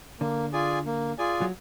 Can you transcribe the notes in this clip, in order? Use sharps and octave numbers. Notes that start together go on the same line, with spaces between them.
D3 A#3
F4 G#4 D5 G#5
A#3
F4 G#4 D5 G#5
F#3